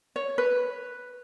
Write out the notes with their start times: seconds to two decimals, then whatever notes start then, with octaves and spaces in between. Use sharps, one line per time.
0.16 C#5
0.38 B4